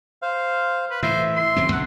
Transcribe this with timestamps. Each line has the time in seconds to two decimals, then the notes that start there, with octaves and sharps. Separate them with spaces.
0.22 C5 F5
0.90 B4
1.03 A2 E3 C5 E5
1.36 C6
1.57 D#1 F#3 C4
1.72 B1 D3 F#5